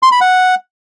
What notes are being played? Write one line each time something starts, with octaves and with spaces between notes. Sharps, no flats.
C6
B5
F#5